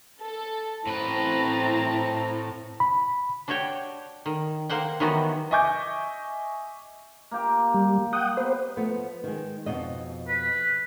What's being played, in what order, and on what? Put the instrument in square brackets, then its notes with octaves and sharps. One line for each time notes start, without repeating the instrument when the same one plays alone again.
[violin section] A4
[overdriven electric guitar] A2 B4 [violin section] C4 A5 [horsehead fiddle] E4 A#5
[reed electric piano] B5
[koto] D4 F#4 G4 C#5 G5
D#3
A#3 C5 F#5 G5
D#3 E3 F#3 B3 F#4 G4
[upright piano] D#5 E5 G#5 C#6 D6 G6
[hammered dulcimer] A#3 G4
[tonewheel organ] G3
F#5 G5 D#6
[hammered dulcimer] B3 [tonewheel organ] C5
[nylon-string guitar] F3 A3 B3
D#3 G#3
F2 B2 D#5
[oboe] B4